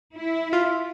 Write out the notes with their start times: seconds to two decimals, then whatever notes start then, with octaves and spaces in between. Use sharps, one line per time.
0.17 E4
0.53 F4